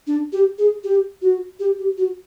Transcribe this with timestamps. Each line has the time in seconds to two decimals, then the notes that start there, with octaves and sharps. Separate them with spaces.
0.07 D4
0.32 G4
0.58 G#4
0.84 G4
1.22 F#4
1.60 G4
1.79 G4
1.98 F#4